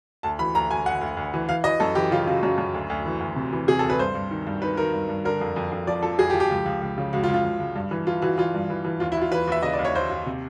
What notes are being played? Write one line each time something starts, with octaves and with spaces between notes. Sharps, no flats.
D2 A5
E3 B5
D2 A#5
D2 G#5
D2 F#5
D2
D2
E3
E3 F5
E3 D#5
F#2 A4
E3 G4
C#3 F4
C#3 F#4
F#2 F#4
F#2
D2
D2
E3
D2
C3
E3
C3 G#4
A4
D2
B4
G2 C5
G2
D#3
G2
D#3 B4
D#3 A#4
G2
G2
D3 A#4
F2
F2
F2
F3 D5
F3 A4
F2 G#4
G4
F3
G4
C#2
C#2
C#2
C#3
C#2 F#4
F4
C#2
F4
C#2
C#2
G2
E3
E3 F4
E3 F#4
E3 F4
G2
E3
E3
D#2 F4
E4
D#2 F4
E3 B4
D#2 E5
C#3 D#5
D5
D#2
C#5
D#2 C5
D#2
C3